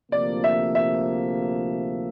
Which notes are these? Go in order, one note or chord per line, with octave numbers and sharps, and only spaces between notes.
D2 C3 F3 A#3 D5
E5
E5